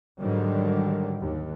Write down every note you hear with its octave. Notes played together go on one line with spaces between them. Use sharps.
G#2 D3 D#3 F#3 G3
D#2